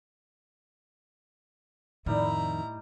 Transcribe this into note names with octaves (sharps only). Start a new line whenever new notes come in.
F2 A2 D#3 G3 D#4 E4 A#5